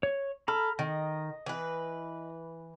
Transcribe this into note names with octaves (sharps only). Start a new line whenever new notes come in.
C#5
A4 A#5 B5 F6
D#3 D#5
E3 B4